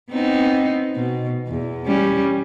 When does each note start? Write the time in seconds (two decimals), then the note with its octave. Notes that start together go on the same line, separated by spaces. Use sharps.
0.10 B3 C4 D#4
0.95 B2
1.48 E2
1.86 G3 C#4